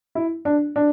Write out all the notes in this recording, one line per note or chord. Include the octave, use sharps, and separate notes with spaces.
E4
D4
D4